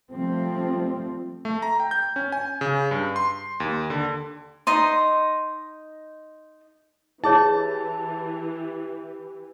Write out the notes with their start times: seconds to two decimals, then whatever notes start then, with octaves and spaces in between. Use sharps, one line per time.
0.12 F3 G3 A3 C4
1.45 A3
1.62 A#5
1.80 G5
1.91 G6
2.16 C#4
2.32 G#5
2.61 C#3
2.91 G2
3.16 C6
3.60 D#2
3.90 D3
4.67 D#4 D#5 C6
7.24 E3 E4 G4 G#4 C#5 A5